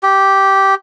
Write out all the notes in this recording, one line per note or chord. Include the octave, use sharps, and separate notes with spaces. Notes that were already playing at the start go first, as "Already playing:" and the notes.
G4